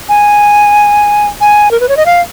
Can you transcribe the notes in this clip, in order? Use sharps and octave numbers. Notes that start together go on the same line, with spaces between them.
G#5
G#5
A#4
B4
C#5
D#5
F5